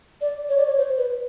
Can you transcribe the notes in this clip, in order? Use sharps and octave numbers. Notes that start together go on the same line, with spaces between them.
D5
C#5
D5
C#5
C5
B4